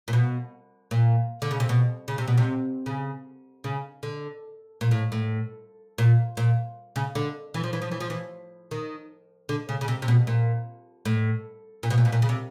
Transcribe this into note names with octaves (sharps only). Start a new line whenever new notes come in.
A#2
B2
A#2
D3
C#3
C3
B2
C#3
C3
B2
C3
C#3
C#3
D3
A#2
A2
A2
A#2
A#2
C#3
D3
E3
F3
E3
F3
E3
F3
E3
D#3
D3
C#3
C#3
C3
C3
B2
A#2
A2
A#2
B2
A#2
B2
A#2
C#3
C3